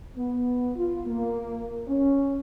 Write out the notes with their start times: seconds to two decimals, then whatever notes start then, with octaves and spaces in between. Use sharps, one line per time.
0.16 B3
0.76 F4
1.07 A#3
1.88 C#4